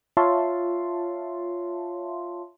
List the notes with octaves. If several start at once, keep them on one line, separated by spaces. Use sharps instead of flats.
F4 C#5 E5 F5 A5 C6